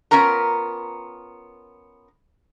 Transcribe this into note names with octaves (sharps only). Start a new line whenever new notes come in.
B3 C#4 F4 A#4 A#5